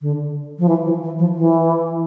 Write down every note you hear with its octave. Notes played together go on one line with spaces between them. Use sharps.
D3
F3
E3
E3
E3
F3
E3